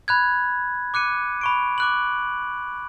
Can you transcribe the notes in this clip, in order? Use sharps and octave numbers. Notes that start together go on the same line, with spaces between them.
B5 F#6 G#6
D6 F#6 C#7 D#7
B5 C#6 D7
D6 F#6 F#7